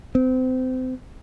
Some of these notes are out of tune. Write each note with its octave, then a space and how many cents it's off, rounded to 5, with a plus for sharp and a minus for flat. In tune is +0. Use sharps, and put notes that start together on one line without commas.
C4 -30